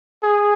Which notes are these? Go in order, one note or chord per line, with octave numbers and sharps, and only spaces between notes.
G#4